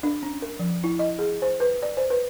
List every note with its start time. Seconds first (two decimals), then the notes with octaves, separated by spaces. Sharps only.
0.03 D4
0.23 C#4
0.42 A#4
0.59 F3
0.84 E4
0.99 D#5
1.19 G#4
1.42 C5
1.60 B4
1.83 D5
1.97 C5
2.10 B4